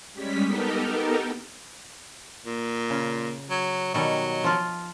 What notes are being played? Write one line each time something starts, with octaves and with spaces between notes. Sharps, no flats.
G3 G#3 C#4 B6
B3 D#4 G4 A4 A#4
A#2
C#3
F#3
B2 D#3 F#3 G3
F3 F4